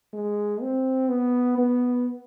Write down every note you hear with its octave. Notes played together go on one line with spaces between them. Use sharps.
G#3
C4
B3
B3